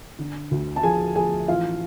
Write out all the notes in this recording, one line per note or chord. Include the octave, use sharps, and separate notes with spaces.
D3
D2
A5
F3 G#4 G#5
F3 G#4 G#5
A1 F4 F5